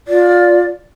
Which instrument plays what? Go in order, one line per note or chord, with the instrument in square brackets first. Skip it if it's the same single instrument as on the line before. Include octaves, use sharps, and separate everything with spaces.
[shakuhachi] F4 [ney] D5